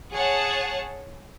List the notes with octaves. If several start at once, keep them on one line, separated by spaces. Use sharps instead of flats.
G#4 C#5 F#5 A5